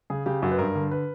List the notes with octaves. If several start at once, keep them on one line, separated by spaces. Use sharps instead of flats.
C#3 G#4
C#3 G4
F#2 F#4
B4
G2 A#4
D3
B4